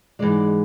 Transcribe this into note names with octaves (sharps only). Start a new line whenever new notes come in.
G#2 E3 G#3 D5